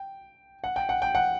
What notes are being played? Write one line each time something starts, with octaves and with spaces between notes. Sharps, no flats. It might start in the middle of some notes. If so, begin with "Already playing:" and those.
Already playing: G5
F#5
G5
F#5
G5
F#5